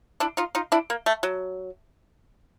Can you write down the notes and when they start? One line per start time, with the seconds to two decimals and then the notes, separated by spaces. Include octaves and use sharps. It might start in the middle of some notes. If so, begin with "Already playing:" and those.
0.20 D4 E4
0.37 D#4 F4
0.55 D#4 F4
0.72 D4 E4
0.90 A#3
1.06 A3
1.23 F#3